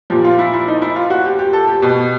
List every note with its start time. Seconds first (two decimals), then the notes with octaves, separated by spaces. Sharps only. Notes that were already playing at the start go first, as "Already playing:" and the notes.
0.10 A#2 F3 G4
0.24 F4
0.39 E4
0.53 E4
0.68 D#4
0.82 E4
0.96 F4
1.10 F#4
1.25 G4
1.39 G4
1.53 A4
1.67 G4
1.82 B2